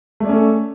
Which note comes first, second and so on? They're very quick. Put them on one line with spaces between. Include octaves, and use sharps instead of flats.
A3 D5 C#4 A4